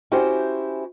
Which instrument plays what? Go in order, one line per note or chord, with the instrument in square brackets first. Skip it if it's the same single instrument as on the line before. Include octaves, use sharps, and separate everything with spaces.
[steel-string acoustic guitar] C#4 E4 F#4 G4 C5